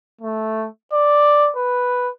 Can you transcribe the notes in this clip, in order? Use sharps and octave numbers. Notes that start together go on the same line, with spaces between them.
A3
D5
B4